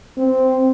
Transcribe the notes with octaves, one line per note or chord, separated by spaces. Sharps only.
C4